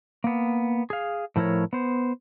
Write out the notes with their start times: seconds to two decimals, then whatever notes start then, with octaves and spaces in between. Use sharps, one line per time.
0.24 A#3 B3
0.90 G#4 F5
1.36 A2 F3 E4 A#4 C#5
1.73 B3 C5